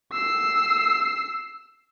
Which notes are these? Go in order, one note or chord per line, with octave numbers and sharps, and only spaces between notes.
E6 C7